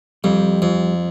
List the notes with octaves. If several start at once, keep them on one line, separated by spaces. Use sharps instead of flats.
F2 G3
F2